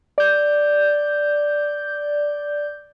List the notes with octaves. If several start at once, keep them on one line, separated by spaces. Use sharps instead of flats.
D5 G6